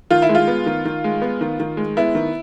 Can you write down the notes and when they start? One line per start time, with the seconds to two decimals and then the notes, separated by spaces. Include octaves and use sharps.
0.11 D#3 F4
0.22 E4
0.29 G#3
0.35 F4
0.48 B3
0.66 D#3
0.85 D#3
1.04 G#3
1.22 B3
1.41 D#3
1.60 D#3
1.77 G#3
1.97 B3 E4
2.15 D#3